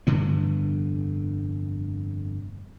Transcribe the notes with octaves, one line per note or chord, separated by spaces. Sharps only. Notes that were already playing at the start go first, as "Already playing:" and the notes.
F1 G2 D3 B3